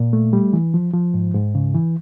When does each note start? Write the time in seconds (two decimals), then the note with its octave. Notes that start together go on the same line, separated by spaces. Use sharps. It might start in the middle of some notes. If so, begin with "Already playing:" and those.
Already playing: A#2
0.13 A3
0.33 G3
0.53 E3
0.74 F3
0.94 F3
1.14 G#2
1.34 G#2
1.55 C#3
1.75 E3